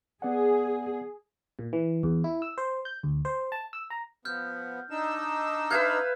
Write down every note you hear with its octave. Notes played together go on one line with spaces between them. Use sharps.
B3 G#4 D5 F#5
A#2
E3
E2
E4
E6
C5
G6
D2
C5
A5
E6
A#5
F3 B3 F6 G6
D4 D#4 E6
B4 E5 F5 G6 G#6